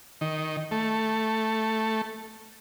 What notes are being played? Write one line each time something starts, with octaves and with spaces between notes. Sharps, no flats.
D#3
A3